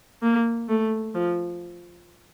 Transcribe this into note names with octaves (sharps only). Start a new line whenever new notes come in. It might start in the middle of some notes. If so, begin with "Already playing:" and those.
A#3
A3
F3